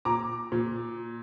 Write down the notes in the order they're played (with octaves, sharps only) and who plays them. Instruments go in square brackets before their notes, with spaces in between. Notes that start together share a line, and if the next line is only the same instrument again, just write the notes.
[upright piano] A#2 A#5 D6
A#2